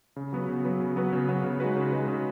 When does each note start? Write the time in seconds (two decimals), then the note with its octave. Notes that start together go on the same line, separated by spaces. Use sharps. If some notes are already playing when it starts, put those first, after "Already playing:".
0.16 C#3
0.33 F#3 B3 F#4 B4
0.49 C#3
0.65 F#3 B3 F#4 B4
0.80 C#3
0.96 F#3 B3 F#4 B4
1.13 C#3
1.28 F#3 B3 F#4 B4
1.44 C#3
1.60 G#3 D#4 F#4 B4
1.76 C#3
1.92 G#3 D#4 F#4 B4
2.08 C#3